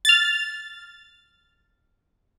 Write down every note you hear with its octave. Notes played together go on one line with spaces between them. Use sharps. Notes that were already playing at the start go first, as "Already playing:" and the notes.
F6 A6